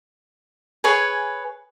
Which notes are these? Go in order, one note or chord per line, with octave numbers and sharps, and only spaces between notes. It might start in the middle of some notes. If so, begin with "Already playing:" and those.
G#4 B4 C#5 G#5